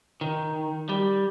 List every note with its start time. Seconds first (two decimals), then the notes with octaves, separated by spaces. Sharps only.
0.21 D#3
0.89 G3